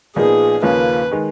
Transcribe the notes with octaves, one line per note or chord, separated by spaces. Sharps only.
A#2 F3 B3 D#4 G#4
D#2 C#3 F3 A#3 C#4 B4
D#3 G#3